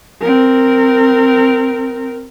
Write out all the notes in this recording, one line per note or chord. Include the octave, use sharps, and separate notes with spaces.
C4 A#4